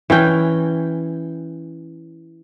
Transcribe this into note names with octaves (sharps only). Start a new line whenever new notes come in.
E3 C#4 G5